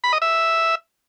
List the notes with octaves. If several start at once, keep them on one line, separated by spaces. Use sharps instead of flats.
B5
D#5
E5